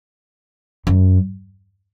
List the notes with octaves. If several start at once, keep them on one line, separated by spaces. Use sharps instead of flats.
F#2